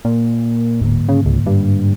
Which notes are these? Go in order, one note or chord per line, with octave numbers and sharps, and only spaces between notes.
A#2
D1 G#2 D3 A#3
C#3
C#2
G2